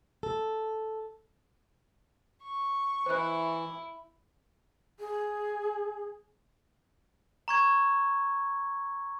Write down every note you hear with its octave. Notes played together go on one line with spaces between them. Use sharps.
A4
C#6
E3 E4 C5 F#6
G#4
A#5 C#6 G#6